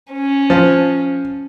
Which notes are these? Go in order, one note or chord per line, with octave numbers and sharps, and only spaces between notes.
C#4
F3